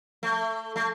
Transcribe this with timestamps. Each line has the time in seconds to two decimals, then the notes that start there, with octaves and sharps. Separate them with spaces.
0.23 A3
0.76 A3